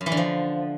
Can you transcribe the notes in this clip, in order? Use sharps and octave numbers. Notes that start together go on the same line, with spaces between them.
F#2
E3
D3
F3